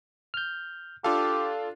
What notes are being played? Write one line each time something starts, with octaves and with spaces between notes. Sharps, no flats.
F6 G6
D4 F4 G4 A4 F5